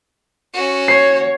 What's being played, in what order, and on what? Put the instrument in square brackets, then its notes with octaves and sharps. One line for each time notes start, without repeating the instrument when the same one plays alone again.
[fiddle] C#4 F#4
[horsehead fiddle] C#5 [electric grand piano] C7